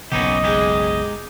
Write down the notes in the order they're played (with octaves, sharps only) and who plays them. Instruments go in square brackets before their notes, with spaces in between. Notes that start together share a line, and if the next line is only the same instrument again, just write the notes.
[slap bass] F#1 B1 B2 [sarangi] B3 [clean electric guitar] C#4 D#4 G4 [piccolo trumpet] D#5
[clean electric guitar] G#3 D#4 G4 [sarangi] G#4